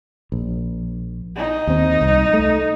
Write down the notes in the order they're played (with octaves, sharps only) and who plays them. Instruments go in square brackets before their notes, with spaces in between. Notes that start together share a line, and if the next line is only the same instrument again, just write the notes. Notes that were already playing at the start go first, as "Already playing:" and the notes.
[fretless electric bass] A#1
[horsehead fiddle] D#4
[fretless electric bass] D#2 C4
C2
A3